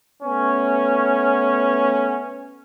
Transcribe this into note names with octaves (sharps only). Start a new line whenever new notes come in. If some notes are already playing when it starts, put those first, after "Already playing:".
A3 B3 C#4